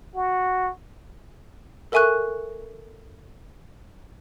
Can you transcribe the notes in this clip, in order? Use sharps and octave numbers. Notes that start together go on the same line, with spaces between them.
F#4
A4 A#4 E5 G#5 C#6 F#6